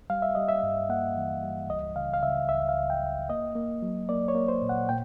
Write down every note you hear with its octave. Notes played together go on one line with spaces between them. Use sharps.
G3 F5
E5
G3 D#5
E5
G2
A#3 F#5
E3
G3
C#2 D#5
C#3 F5
F5
C#3 E5
C#2 E5
F5
C#2
G5
C#2
A#3 D#5
A#3
F#3
A#3 D5
C#5
A#3
C5
A#2
F#5
A#2 G5